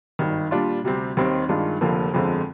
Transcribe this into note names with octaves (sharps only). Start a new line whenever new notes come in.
G#1 G2 D#3
A#2 G3 D4 F4
D2 C3 G3 C4
D#2 D#3 G3 C4
G2 D#3 G#3 D4 F4
F1 F2 D3 F3 A#3
G1 F2 D3 G#3 C4